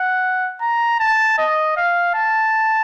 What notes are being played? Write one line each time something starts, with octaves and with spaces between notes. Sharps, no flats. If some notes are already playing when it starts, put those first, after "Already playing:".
Already playing: F#5
A#5
A5
D#5
F5
A5